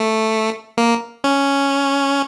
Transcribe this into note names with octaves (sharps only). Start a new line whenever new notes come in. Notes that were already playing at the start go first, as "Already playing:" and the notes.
Already playing: A3
A#3
C#4